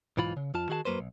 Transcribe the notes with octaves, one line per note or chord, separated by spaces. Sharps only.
B1 G#2 E3 F4 B5
C#3
F2 F4 A5
D#3 F#4 G#4 F#5 A5
F#2 F#3 A#3 B4 C5
B1